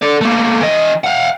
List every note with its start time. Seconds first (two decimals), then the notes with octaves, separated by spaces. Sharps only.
0.02 A4 D5
0.21 A3 A#3
0.61 E3 D#5
1.04 F5 F#5